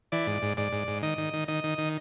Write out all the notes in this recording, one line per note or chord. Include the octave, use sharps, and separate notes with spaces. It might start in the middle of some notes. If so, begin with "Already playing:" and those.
E3 D5
G#2
G#2
G#2 D5
G#2
G#2
D#3 D#5
D#3
D#3
D#3 D#5
D#3
D#3